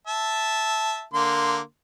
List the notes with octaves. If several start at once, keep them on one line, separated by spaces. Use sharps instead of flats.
E5 A5
D3 A#3 C6